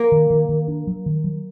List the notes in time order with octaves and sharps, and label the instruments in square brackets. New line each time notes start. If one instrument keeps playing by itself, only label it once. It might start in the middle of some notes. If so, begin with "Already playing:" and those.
Already playing: [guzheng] A#3
[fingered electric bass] D#3
D#3
D#3
D4
F#3
D#3
F#3